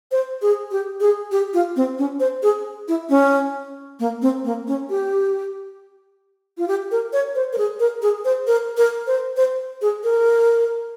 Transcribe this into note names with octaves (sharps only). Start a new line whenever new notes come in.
C5
G#4
G4
G#4
G4
F4
C4
C#4
C5
G#4
E4
C#4
A#3
C4
A#3
C#4
G4
F4
G4
A#4
C#5
C5
A#4
G#4
A#4
G#4
C5
A#4
A#4
C5
C5
G#4
A#4